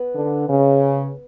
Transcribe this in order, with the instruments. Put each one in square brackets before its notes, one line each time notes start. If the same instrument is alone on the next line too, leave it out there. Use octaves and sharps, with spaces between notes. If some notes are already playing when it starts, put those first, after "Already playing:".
Already playing: [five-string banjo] B3
[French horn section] D3
C#3